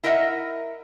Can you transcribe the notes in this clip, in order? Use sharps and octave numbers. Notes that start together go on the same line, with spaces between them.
E4 A#4 D#5 E5 F#5